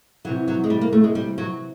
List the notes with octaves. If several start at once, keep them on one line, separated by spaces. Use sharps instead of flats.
C3 E3 F#3
F#3
G#3
G3
A#3
A3
G#3
G3
F#3